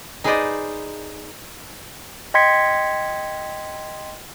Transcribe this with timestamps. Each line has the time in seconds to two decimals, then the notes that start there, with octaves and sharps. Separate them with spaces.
0.24 D#4 G#4 B4 C5 D5 D#5
2.34 D#5 G5 C6 G#6 B6 C#7